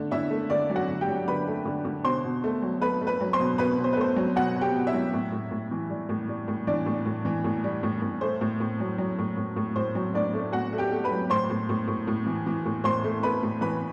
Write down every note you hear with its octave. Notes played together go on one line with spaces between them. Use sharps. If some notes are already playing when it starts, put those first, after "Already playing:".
Already playing: D3 A3
D3 E4 E5
A3
D3 D4 D5
F#3
F#4 F#5
D3
G4 G5
F#3
D3 B4 B5
A3
D3
D3
B2 C5 C6
B2
A3
F#3
A3 B4 B5
A3
B4 B5
F#3
C5 C6
B2
B2 B4 B5
B2
C5
B4
A3 C5
F#3
B2 F#4 F#5
B2
G4 G5
B2
E4 E5
F#3
A2
A2
A2
E3
G3
A2
G3
A2
E3 D4 D5
A2
A2
E3
A2
G3
A2
A2
A3 C5
A2
A2
F#3
F#3
A2
A2
A2
A2 C5
F#3
A2 D4 D5
A3
A2 F#4 F#5
A3
G4 G5
A3
B4 B5
F#3
A2 C5 C6
A2
A2
A2
A2
E3
E3
A2
A2 C5 C6
A3
A3 B4 B5
A2
E3 B4 B5